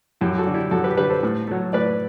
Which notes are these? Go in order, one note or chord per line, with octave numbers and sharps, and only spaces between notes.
F#2 E4 G4
F#4 A4
D3 G3
E4 G4
F#2 F#4 A4
G4 B4
D3 G3 G4 B4
A4 C5
A2
F#3 A3
A2 B4 D5